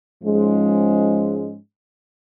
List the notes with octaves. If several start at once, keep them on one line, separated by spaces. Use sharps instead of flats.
G#2 F3 G#3 C#4